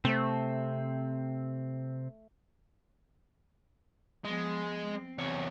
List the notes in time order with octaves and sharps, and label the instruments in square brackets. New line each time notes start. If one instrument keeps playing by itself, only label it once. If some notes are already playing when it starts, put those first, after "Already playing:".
[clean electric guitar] C3 C4 [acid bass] A3
[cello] F3 B3 [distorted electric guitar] G#3
[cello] C4
[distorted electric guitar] E2 C#5 [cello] C3